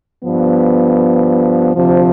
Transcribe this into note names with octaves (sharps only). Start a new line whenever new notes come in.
G2 F3 B3
D2 C3 F3